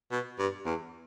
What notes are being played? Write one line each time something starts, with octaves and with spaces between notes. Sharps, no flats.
B2
G2
E2